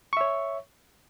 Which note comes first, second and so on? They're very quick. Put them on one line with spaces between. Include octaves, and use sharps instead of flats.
C#6 E5 C#5